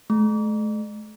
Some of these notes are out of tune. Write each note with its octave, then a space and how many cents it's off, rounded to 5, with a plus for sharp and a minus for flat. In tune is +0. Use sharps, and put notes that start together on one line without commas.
A3 -40